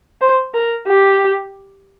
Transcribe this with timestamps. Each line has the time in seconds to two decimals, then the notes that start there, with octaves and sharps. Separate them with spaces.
0.21 C5
0.54 A#4
0.88 G4